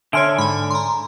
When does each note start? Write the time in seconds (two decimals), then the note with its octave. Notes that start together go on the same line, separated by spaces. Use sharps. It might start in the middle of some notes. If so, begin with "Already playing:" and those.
0.13 D3 C#5 E5 G#5 C6 F6 D7
0.38 G#2 G#5 B5
0.71 A#5 C6